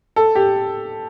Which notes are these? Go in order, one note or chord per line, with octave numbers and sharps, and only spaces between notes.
A4
G4